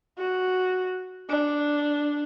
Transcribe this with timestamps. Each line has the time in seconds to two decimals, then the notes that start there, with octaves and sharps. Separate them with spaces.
0.19 F#4
1.30 D4